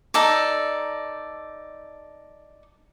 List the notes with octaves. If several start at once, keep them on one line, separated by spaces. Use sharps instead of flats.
D#4 A4 D5